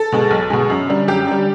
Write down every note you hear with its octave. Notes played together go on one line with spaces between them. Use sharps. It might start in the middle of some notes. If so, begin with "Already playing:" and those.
Already playing: A4
B2 G#3
B1
B2 G#3
F#2
D3 G3
F#2 G4
D3 G3